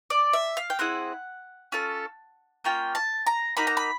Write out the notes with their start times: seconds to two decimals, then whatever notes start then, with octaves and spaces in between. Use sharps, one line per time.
0.10 D5
0.33 E5
0.57 F5
0.70 G5
0.79 C4 E4 G#4 F#5
1.72 C#4 F4 A4
2.64 A#3 C#4 F4 G5
2.95 A5
3.26 A#5
3.57 A#3 D#4 F#4 B5
3.67 A#5
3.77 B5